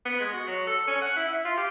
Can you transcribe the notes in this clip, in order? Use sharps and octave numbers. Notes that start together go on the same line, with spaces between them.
B3
G#3
F#4
F#3
A4
C#4
F#5
E4
E5
F4
G4